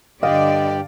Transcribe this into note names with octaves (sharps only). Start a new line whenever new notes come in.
G2 D3 G4 D5 D#5 F5 G5